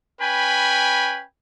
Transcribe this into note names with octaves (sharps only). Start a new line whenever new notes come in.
C#4 B4 G5 G#5 B5